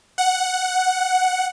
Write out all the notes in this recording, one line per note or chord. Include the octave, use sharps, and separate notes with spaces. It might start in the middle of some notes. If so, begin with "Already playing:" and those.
F#5